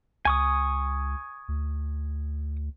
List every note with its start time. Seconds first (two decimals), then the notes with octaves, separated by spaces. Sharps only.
0.25 C#2 G#5 C#6 D#6
1.48 D2